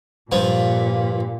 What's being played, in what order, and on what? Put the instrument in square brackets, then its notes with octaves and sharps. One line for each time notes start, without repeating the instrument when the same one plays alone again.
[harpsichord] G2 F3 [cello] A#2